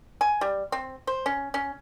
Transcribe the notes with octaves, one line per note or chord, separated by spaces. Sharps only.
G#5
G3
C4
C5
C#4
C#4